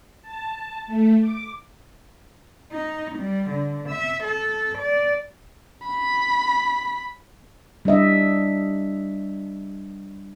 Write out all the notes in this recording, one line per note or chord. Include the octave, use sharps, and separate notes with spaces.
A5
A3
D6
D#4
G3
D3
E5
A4
D5
B5
G3 D4 D#5 E5